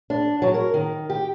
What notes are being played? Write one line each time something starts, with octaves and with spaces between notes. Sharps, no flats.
D4
F#3
A#4
D#3
G4